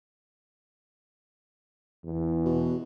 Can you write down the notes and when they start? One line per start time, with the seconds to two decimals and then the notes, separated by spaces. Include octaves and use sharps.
2.04 E2
2.45 B2